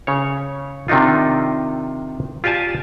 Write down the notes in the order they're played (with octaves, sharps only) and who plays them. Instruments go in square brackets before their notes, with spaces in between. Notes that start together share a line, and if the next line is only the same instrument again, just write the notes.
[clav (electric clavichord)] C#3 C#5
C3 D#3 D4 D#4 F4
F4 G4 D5 G#5 A5